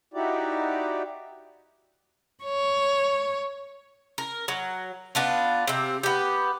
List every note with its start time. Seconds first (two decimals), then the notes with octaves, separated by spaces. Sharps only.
0.14 D#4 E4 F#4 G4 D5
2.44 C#5
4.18 A#4
4.48 F#3
5.15 B3 D4 F4
5.67 C3 C4
6.03 B3 G4